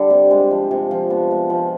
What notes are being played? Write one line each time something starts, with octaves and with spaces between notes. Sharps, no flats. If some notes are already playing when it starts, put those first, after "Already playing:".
Already playing: D3 G3
C3
G#3
F3
C3
F3
B3
G#3
F3